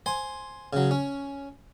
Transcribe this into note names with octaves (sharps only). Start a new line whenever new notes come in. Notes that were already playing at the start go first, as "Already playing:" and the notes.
C5 G#5
C#3 F#3
C#4